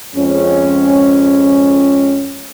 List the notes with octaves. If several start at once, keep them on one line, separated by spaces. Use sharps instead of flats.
F2 G#3 C#4